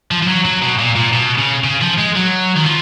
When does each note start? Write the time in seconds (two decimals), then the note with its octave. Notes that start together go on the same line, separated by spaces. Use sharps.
0.11 F3
0.22 F3
0.28 F#3
0.45 F#3
0.62 B2
0.79 A#2
0.96 A#2
1.13 B2
1.38 C#3
1.64 C#3
1.81 F3
1.98 G#3
2.16 F#3
2.56 D#3
2.66 F3